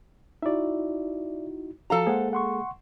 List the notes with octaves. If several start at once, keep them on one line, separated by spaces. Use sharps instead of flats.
D#4 E4 F#4 D5 E5
F3 F#4 A4 F5 A#5
G#3 A#3 G#4 C5 F#5
F#5 C6 C#6